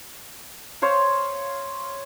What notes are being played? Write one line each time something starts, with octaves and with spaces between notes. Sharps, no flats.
C5 C#5 F5